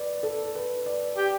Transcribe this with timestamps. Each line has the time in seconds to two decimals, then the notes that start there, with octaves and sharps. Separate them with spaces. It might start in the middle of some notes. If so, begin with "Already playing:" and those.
Already playing: B4 D5
0.23 A4
0.55 B4
0.86 D5
1.17 G4